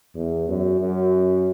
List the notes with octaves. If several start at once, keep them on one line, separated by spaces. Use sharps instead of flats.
E2
F#2
F#2